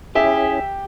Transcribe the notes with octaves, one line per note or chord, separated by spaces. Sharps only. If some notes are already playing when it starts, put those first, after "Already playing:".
C#4 E4 G4 G#4 E5